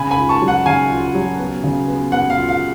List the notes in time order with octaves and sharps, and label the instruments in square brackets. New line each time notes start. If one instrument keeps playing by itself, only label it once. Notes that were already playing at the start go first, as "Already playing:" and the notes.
Already playing: [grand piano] C#3 [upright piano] G#5 B5
[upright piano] G#5 B5
[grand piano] F4
[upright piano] A5 C#6
[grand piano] F#3
[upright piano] F#5
[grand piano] C#3 [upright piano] F5 G#5
[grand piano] F4
F#3
B3
C#3
B3
[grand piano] B3 [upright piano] F#5
[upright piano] F5
[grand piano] F4
[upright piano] F5